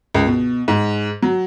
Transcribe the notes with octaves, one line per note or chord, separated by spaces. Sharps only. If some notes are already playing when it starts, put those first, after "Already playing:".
C#2
B2
G#2
F#3